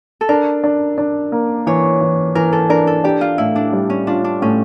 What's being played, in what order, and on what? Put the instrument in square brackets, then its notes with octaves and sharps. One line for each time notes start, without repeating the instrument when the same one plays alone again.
[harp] A4
[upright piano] D4 [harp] A#4
[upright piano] D4
D4
A#3
[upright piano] E3 [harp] C#5
[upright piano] E3
[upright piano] E3 [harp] A#4
[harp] A4
[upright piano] D4 [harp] A#4
[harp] A4
[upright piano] D4 [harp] G4
[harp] F4
[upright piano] A2 [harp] E4
[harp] D4
[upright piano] G3
[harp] C#4
[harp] D4 [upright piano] F4
[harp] D4
[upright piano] A2 [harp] C#4